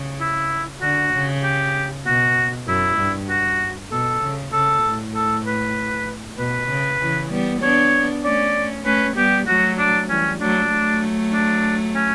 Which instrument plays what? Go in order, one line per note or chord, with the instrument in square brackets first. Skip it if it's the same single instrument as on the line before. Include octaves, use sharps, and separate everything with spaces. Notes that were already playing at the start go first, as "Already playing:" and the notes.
Already playing: [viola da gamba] C#3
[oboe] E4
[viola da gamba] D3 [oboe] F#4
[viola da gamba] C#3
[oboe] G4
[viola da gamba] B2 [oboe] F#4
[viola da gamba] F#2 [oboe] E4
[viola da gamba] G2
[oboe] F#4
[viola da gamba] B2 [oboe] A4
[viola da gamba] C#3
[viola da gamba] C#3 [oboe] A4
[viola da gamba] A2
[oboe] A4
B4
[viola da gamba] B2 [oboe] B4
[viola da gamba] C#3
C#3 E3
G3 B3
[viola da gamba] B3 D4 [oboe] C#5
[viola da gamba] A3 C#4 [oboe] D5
[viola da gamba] A3 C#4 [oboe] B4
[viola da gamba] G3 B3 [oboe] G4
[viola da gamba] F#3 A3 [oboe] F#4
[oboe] D4
[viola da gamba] E3 G3 [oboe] C#4
[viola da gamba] F#3 A3 [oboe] D4
[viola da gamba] F#3 A3
[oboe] D4
C#4